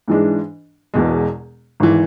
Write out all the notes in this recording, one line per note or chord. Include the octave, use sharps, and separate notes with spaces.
G#2 E3 G#3 D4
E1 E2 B2 G#3
G#1 E3